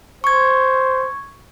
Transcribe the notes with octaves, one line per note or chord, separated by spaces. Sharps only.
C5 C#6 G#6